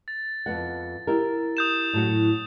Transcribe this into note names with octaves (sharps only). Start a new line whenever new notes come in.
A6
F2 B3 F#5
E4 G4 A#4
D#6 G6 E7
A2 F#3 F#4